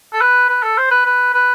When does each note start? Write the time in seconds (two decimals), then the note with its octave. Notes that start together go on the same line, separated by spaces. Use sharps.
0.13 A4
0.21 B4
0.49 B4
0.63 A4
0.78 C5
0.91 B4
1.06 B4
1.34 B4